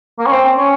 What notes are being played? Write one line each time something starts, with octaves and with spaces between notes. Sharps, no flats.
A#3
C#4
C4
C#4